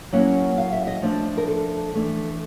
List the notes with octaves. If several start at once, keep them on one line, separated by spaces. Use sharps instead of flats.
F#3 A#3 C#4 E4 F#5
F5
E5
D#5
F3 A3 D4
A#4
A4
E3 A3 D4